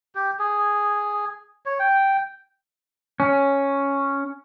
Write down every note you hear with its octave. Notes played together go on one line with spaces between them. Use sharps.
G4
G#4
C#5
G5
C#4